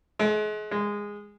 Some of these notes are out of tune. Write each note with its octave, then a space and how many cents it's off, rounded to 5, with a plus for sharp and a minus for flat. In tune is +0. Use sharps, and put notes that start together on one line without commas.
G#3 +40
G#3 -15